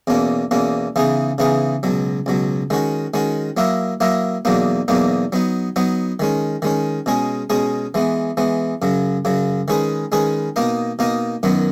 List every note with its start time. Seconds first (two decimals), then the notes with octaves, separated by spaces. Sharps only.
0.07 E2 B2 A#3 C#4
0.51 E2 B2 A#3 C#4
0.96 C#3 E3 B3 D#4 G#4
1.38 C#3 E3 B3 D#4 G#4
1.83 C#2 B2 F#3
2.26 C#2 B2 F#3
2.70 D#3 G#3 C#4 F#4
3.14 D#3 G#3 C#4 F#4
3.57 F#3 A#3 E4 A#4 D#5
4.00 F#3 A#3 E4 A#4 D#5
4.45 E2 B2 F#3 A#3 D#4
4.88 E2 B2 F#3 A#3 D#4
5.32 F#3 B3 D#4
5.76 F#3 B3 D#4
6.19 D#3 G#3 C#4
6.62 D#3 G#3 C#4
7.06 B2 G#3 C#4 G#4
7.50 B2 G#3 C#4 G#4
7.94 E3 G#3 B3
8.37 E3 G#3 B3
8.82 F#2 C#3 F#3
9.25 F#2 C#3 F#3
9.68 D#3 G#3 C#4 G#4 B4
10.12 D#3 G#3 C#4 G#4 B4
10.56 B2 A#3 D#4 A#4 D#5
10.99 B2 A#3 D#4 A#4 D#5
11.43 F#2 D#3 F#3 B3